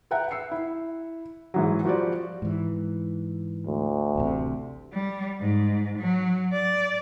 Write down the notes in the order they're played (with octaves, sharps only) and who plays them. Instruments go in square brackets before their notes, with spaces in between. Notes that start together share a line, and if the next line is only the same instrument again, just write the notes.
[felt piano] B4 E5 F#5 G5 A#5 F#6
E6 C7 C#7
E4
G#2 E3 F#3
F3 G3 F#4 G4 C5 D5
[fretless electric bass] G#2 E3
[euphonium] D2
[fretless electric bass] D1 A1 C3
[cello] G3
G#2
F#3
D5